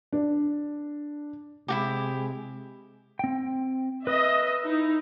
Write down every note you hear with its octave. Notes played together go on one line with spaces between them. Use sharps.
D4
C3 G#3 E4 F#4 G4
C4 G5
B4 D#5 E5
D#4 E4